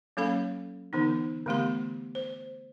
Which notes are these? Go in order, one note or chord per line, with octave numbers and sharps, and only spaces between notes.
F#3 A#3 C#4 A4 F5 B5
D3 E3 B3 D#4
D3 E3 A3 B3 G4 C6
C5